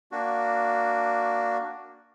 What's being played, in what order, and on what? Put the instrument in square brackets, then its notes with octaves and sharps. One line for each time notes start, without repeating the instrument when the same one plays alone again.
[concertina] A#3 D4 F#4